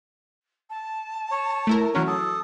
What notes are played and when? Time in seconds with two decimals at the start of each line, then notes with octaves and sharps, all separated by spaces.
0.70 A5
1.31 C#5
1.67 A3 E4 A#4
1.95 E3 F#3 C#4 F#4 A#4
2.07 A4 D#6